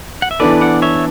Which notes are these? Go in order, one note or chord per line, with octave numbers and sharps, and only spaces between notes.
F#5
E5
E3 B3 D4 A4 B4 D5
D5 F#5
C#5 E5